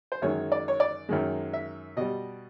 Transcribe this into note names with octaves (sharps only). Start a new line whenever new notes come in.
C5
F#2 D#3 G#3 C#5
D5
C#5
D5
F#2 D#3 G#3
E5
B2 G3 D#5